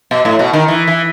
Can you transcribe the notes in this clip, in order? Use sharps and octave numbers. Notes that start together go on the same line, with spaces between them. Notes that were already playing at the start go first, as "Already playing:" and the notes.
B2
A2
B2
D#3
E3
E3